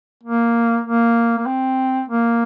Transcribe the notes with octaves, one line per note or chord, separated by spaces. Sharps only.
A#3
A#3
A#3
C4
A#3